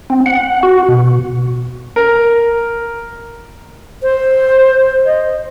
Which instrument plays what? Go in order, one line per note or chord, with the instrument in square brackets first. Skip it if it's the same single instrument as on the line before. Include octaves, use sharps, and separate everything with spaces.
[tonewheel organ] C4
F#5
F#4
B2
[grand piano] A#4
[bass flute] C5
D#5